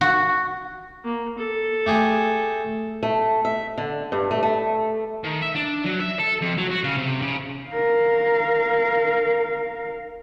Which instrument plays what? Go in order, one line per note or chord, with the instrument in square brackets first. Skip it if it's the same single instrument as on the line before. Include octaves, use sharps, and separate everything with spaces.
[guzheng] F#4
[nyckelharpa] A#3
A4
[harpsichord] A3 G4 G#4
[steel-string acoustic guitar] A3
E5
D3
G2
A3
A3
[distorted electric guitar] D#3
E5
D4
F#3
E5
A4
F2
F#3
F#4
C#3
C3
C#3
[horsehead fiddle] A#4 F5